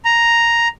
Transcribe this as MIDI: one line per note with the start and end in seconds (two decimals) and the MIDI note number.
0.05 0.68 82